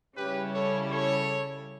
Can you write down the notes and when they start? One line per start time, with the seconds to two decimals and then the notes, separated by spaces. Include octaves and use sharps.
0.15 C#3 G3 C#4 E4 G4 B4
0.53 A4 C#5
0.91 A4 C#5